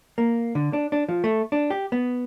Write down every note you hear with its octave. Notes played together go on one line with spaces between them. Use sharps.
A#3
D3
D4
D4
F3
A3
D4
G4
B3